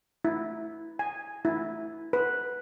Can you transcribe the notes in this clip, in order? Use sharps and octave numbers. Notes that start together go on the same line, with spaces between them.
E4
G#5
E4
B4